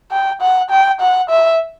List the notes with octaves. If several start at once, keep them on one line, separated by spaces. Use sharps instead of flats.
G5
F#5
G5
F#5
E5